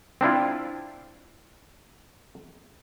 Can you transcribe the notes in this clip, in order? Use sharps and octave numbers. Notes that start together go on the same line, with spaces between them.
C4 D4 E4 F4